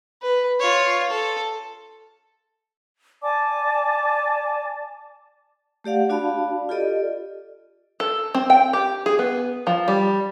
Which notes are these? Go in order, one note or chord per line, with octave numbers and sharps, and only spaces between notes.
B4
F4 C#5
A4
D5 G#5 A5 D6
A3 G4 D5 F5 F#5
D4 F#4 D5 F5 A5 B5
F4 G4 A4 D5 D#5
A4
C4
G5
G4
G#4
B3
F3
G3